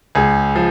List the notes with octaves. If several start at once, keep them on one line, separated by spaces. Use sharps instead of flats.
C#2 G#4
F3